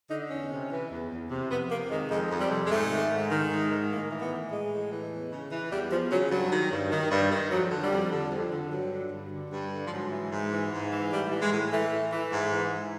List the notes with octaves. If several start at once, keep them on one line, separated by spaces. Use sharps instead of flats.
D3 D#4
E2 C#4
C3
E3
E2
E2
C3
F2 B3
C3 A#3
D#3 G#3
F2 G#3
F2
G3
C3
G#3
G#2 A3
D#3
G#2
D#3
G#2
D#3
A2 A#3
E3
B3
A2
E3 G#3
A2
E3
E2
C#3
E3
E2 G3
E2 F3
C#3 F#3
G2 F#3
D#3
G2
D#3
G2
D#3
F2 F#3
D3
G3
F2
D3
F2
D3
G2 F#3
D3
G2
D3
G2
D3
F3
G#2 F#3
E3
G#2
E3
G#2
E3
A2 G3
E3
G#3
A2
E3 A3
A2
E3
G#2
E3
G#2